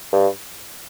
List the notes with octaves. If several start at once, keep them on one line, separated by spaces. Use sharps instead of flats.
G2